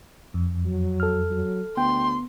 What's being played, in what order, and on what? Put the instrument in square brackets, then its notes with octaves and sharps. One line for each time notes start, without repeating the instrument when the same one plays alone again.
[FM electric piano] F2
[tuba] F#3
[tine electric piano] A4 F6
[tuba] F#3
[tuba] D2 [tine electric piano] B3 [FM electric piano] G5 [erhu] C6